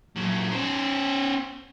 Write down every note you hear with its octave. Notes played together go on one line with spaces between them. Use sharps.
A#2 F#3
C#4 C5